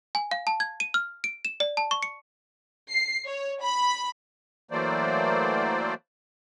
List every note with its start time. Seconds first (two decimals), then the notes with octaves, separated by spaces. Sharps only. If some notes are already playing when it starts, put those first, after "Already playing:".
0.15 G#5
0.31 F5
0.47 A5
0.60 G#6
0.80 D#7
0.94 F6
1.24 D7
1.45 E7
1.60 D5
1.77 A5
1.91 C#6
2.03 C#7
2.90 C7
3.26 C#5
3.62 B5
4.71 E3 F#3 A3 A#3 C5 D5